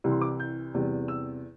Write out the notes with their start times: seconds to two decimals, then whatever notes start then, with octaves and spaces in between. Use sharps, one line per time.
0.04 C2 C3 E3 G3
0.12 C6
0.21 D6
0.40 G6
0.74 E2 C3 G3
1.08 E6